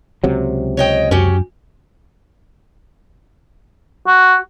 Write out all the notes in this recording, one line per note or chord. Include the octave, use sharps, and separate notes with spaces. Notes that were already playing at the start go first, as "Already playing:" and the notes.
C#2 C3 F#3
C#5 D#5 G5
F#2 C#4 F#4 G4
F#4